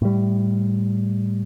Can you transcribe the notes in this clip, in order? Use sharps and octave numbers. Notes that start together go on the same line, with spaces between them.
A2 G3